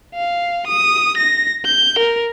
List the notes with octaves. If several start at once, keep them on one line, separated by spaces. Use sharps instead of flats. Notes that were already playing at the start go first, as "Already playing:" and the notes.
F5
D#6
A#6
G6
A#4